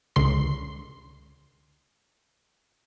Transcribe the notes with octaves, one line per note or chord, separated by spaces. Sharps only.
C#2 D3 C6 C7